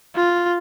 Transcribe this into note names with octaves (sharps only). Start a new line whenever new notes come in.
F4